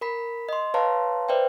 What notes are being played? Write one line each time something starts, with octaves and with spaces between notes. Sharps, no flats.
A#4 B5 B6
D#5 C6
B4 C#5 F5 A5 A#5 C6
B4 C5 D5 E5 G5